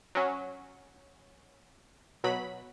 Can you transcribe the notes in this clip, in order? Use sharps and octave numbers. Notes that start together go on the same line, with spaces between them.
F#3 C#4
B2 F#3 B5